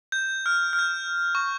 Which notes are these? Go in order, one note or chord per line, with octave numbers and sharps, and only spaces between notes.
G6
F6
F6
G6
C#6